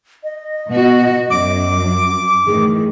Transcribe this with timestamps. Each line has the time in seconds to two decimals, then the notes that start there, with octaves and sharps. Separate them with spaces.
0.24 D#5
0.70 B2 F#4
1.30 F#2 F#3 D6
2.46 A2 D#3 E3 G#4